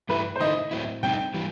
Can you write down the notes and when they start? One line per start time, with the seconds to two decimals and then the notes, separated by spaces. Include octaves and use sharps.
0.09 G2 E3 A3 E4 B4
0.36 C5
0.40 D#3 A3 E4 D#5
0.71 A2 F#3 C4 E4
1.03 B2 G3 C4 D#4 G5
1.34 E3 G3